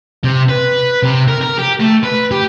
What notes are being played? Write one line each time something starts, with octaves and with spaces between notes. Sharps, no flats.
C3
B4
C3
A#4
A#4
G4
A3
B4
G4